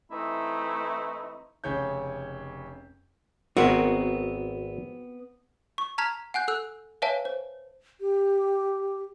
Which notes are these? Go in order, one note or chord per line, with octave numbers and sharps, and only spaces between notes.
E3 A3 C4 D#4 E4
F1 C#3 C#5 G6
G#1 B3 C4 F#4 A#4 E5
C#6
A5 A#5 F6 G#6 B6 F7
F#5 G#5 F#6 G6
A4 E6 F#6
B4 C#5 E5 F5 G#5 A5
C5
G4